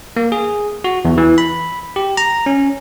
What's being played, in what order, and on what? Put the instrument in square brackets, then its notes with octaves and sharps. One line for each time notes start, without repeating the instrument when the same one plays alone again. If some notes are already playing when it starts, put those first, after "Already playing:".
[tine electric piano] A#3
G#4
F#4
E2
E3
B5
G4
A#5
C#4